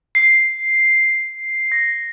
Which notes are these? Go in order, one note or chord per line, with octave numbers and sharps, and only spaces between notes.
C7
A#6